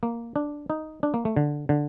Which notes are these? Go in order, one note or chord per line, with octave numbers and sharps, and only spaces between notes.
A#3
D4
D#4
D4
A#3
A3
D3
D3